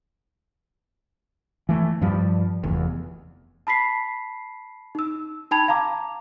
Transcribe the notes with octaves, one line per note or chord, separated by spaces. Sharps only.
E3 A3
G2 F3 G3
F1 E2
A5 B5 B6 C7
D#4 E6
D#4 G5 A5 B5 G#6 F7
F5 A5 A#5 D6